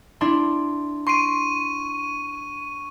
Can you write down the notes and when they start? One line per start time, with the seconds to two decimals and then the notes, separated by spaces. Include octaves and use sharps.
0.21 D4 E4 C6
1.07 C6 C#6 C7 D7 D#7